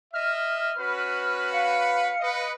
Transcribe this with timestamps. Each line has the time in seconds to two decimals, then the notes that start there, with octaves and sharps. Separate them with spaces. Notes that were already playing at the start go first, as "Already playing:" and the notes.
0.14 D#5 E5 F6
0.78 C#4 F#4 B4
1.52 F5 C#7
2.21 B4 D#5